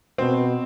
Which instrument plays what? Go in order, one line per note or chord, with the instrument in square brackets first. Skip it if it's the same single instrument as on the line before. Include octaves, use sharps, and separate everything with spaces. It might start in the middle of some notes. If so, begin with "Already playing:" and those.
[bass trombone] B2 [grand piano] C4